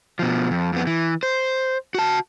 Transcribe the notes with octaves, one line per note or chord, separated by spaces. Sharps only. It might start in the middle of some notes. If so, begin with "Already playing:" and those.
B2 F3
F2
F2 B3
E3
C5
F#4 A5